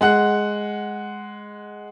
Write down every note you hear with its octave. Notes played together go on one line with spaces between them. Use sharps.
G#3 F#5 F#6